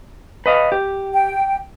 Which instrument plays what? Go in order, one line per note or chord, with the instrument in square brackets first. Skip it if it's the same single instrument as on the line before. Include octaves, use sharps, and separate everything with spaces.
[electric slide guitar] B4 D#5 F5
G4
[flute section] G5